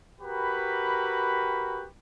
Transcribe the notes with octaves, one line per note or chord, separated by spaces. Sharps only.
F#4 G4 A#4 B4 B5